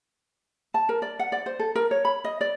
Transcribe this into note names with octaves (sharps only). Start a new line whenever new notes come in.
A5
A#4
D5
F#5
D5
C5
A4
A#4
C#5
B5
D#5
D5